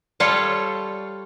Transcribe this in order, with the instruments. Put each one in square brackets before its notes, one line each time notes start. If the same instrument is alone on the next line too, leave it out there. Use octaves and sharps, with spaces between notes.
[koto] G3 F4 A4 C#5